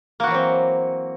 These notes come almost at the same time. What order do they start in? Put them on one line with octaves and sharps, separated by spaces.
A#3 F#4 E3 F#3 C4